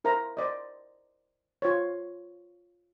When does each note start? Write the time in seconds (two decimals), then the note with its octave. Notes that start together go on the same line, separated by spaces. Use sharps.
0.04 E4 A#4 C5 E5 A#5
0.37 C5 D5 D#5
1.62 F4 C5 C#5